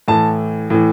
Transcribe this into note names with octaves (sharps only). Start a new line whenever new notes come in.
A2 E3 A5
A2 E3